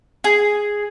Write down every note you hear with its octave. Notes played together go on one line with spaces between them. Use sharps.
G#4